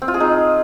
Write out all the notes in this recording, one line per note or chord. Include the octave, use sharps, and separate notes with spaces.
C4
F4
G#4
D#4